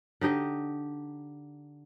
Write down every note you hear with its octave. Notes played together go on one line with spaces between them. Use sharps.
D3 D#4 G4 D#5